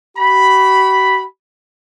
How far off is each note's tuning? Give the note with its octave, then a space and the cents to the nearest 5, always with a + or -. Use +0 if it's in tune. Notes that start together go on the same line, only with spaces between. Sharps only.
F#4 +45 B5 +0